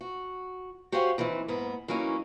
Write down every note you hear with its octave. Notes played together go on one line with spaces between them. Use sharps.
F#4
F#4 G4 C5 C#5 F5 G#5
D#2 E3 C4 D#5 E5
G#2 A#3 B3
E3 F#3 A#3 C#4 D#4